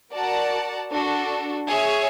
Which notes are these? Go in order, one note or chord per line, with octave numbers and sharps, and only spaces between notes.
F#4 A#4 D5 F#5 A5
D4 F#4 A4
G#4 C#5 E5